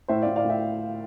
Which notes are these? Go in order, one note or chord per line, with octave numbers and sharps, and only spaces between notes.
A2 C5 E5
A2 D5 F5
D5 F5
A2 E5 G5